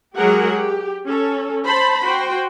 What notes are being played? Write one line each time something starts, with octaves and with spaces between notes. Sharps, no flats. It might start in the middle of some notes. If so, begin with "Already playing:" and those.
F#3 G#3 G4 G#4 A#4 F#5
G4
C#4 A4
C5 A5 B5
F#4 C5 G5